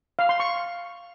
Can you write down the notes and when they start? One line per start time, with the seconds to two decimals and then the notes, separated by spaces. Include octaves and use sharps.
0.19 F5
0.29 C6
0.40 C#6